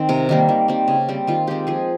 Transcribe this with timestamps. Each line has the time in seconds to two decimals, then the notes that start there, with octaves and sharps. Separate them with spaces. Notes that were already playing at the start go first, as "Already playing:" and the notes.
Already playing: D#3 C4 D#4
0.09 C3 A#4
0.29 D#3 G3 A#3
0.49 D#3
0.68 G3 C4
0.88 C#3
1.09 G3 C4
1.27 D#3 F4
1.47 G#3 C4 G4
1.67 F3 G#4